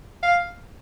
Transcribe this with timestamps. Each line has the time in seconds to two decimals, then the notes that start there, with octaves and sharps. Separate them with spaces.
0.23 F5